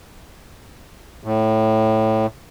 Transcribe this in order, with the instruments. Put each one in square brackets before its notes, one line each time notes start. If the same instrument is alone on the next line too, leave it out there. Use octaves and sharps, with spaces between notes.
[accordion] A2